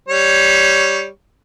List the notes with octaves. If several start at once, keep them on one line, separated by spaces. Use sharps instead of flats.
G3 C#5